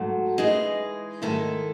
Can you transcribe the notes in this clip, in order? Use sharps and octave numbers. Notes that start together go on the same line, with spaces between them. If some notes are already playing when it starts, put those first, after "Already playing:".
Already playing: G#2 F#3 A3
E3 G#3 D#4 G#4 D#5
G#2 D#3 A3 E4 A4